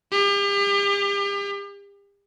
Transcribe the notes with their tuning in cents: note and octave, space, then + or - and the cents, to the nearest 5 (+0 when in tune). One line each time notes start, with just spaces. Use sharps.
G4 +40